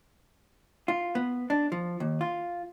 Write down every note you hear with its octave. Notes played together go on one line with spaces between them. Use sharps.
F4
B3
D4
F3
D#2
F4